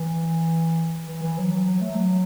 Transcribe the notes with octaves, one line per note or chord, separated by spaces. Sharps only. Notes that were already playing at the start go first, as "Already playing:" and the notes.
Already playing: E3
E3
E3
F#3
F#3
F#3
A3
F#3